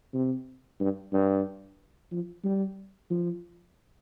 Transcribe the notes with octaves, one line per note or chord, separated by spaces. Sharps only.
C3
G2
G2
F3
G3
F3